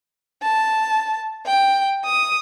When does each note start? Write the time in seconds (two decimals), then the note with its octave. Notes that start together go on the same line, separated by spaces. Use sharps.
0.42 A5
1.46 G5
2.05 D#6